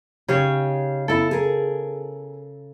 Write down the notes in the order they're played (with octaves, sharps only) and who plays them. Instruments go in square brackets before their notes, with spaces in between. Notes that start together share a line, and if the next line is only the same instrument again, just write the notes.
[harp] C#3 [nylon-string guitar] D#4 G4 C#5
[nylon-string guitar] B3 E4 [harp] A4
[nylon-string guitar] G#4 A#4